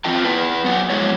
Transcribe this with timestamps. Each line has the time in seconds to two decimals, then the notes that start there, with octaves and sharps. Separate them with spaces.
0.04 E3 C4 F4 G5 A5
0.24 B3 E4 B4
0.64 F#2 F#3 B3 F#5
0.90 F2 F#3 G#3 E4 C#5